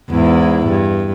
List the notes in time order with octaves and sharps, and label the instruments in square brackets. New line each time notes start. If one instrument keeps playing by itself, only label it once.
[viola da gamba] E2 G#2 E4
G2